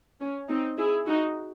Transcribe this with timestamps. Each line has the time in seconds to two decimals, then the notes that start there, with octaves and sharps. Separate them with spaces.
0.21 C#4
0.49 C4 D#4
0.78 E4 G#4
1.07 D#4 F#4